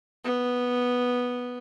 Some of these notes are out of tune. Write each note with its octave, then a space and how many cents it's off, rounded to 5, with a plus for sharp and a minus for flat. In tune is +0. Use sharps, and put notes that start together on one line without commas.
B3 -5